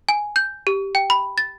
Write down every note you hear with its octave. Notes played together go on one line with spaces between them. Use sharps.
G#5
G6
G4
G5
B5
A6